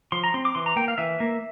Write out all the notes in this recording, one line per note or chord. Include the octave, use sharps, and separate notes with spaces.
F3 C6
A#5
C4 C6
D6
E3 C6
A#5
A#3 G5
F5
E3 E5
A#3